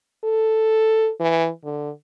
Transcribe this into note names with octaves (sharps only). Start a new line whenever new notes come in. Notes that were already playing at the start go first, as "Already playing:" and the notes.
A4
E3
D3